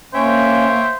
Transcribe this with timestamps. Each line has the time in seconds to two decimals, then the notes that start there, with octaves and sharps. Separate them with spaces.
0.14 A#3 C#4 C5 C#5 E5 G5